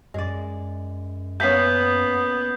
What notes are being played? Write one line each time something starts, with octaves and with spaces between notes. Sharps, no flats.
F#2 G#3 D5
A#3 B3 C#4 G6 B6 C7